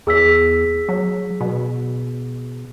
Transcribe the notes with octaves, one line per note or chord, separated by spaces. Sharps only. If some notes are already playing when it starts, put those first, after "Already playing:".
E2 G#4 E6 B6
F#3
B2